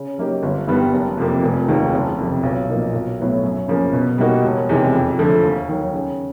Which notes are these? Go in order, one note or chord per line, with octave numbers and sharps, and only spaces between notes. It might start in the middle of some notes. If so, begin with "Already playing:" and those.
Already playing: C#3
F#3 A#3 D#4 G4
G1
G2 D#3 G3 B3
F#1
F2 C3 F3 A#3
F1
D#2 D#3 G#3
F#1
F2 C3 F3
B1
A#2 F3 A#3 D#4
B1
A2 F#3 B3 E4
F#2
C#3 F3 A#3
B2
G3 A#3 D#4 F#4
E1
E2 C3 D#3 G#3
F2
D3 F3 A3 D4
D#2
D#3 F#3
C#3